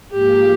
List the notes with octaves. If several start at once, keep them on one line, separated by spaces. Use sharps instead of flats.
G#2 F3 A#3 F4 G4 G#4